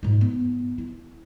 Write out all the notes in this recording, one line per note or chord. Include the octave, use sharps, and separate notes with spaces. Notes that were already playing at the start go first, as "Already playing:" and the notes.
G#2 D#4
B3
E4